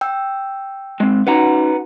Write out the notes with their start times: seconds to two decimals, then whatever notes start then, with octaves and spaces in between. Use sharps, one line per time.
0.01 G5 E6
1.00 G#3 C4
1.27 C#4 D#4 F#4 B4 F#5 A#5